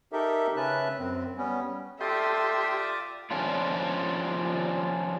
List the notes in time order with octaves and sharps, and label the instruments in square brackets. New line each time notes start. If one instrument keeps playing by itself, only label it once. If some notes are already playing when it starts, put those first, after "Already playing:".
[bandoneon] D#4 G4 A4 A#4 E5
C#3 C#4 B4 E5 A5 F#6
F#2 C4
G3 B3 C#4
[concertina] F4 D5 D#6 [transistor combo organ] G4 G5 C6 [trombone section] A4 [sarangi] E5
[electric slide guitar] F3 G3 C#4 D4 F4